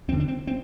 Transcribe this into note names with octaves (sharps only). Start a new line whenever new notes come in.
E2 D3 C4
D4
C4
C4